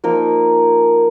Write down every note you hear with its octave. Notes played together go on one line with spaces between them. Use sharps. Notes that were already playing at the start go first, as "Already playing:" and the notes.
F3 A#3 D#4 A#4